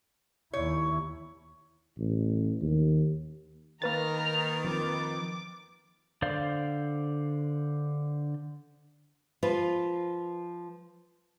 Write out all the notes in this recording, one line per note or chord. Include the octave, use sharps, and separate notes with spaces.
D#2 E4 C#5
A1
D#2
D#3 A#3 B4 A#5 F6 A6
F3 C4 D6
D3 C5 D5 F5
F3 F4 B4